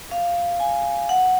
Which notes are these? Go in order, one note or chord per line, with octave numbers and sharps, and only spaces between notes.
F5
G#5
F#5